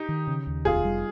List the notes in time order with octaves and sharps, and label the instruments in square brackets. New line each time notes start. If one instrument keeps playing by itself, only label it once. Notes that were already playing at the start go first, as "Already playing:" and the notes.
Already playing: [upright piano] D#4 G4
[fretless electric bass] D#3
C#3
D#2
[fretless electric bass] F1 [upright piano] F4 G#4
[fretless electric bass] G3